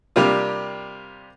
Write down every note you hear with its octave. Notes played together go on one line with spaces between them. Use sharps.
C3 G3 A#3 D4 F4